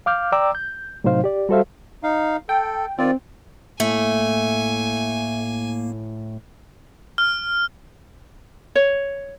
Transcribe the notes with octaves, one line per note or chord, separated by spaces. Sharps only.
F5 D6 F6 G6
D5 G5 A#5 D6 E6
G6
A2 C3 F#3 D#4 C5 F5
G4 D5
G3 F#4 A4 C5 E5 F5
D#4 F5
A4 G5
D#3 C4 F4 D5
A2 A3 A#3 G#5
F6
C#5